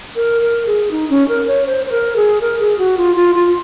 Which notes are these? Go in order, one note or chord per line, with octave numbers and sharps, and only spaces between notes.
A#4
A#4
G#4
D#4
C#4
A#4
C#5
C5
C5
A#4
G#4
A#4
G#4
F#4
F4
F4
F4